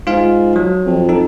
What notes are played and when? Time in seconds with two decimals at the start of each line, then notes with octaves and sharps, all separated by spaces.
0.07 G#2 F4 F5
0.56 F#3
0.86 F2
1.09 D#4 A4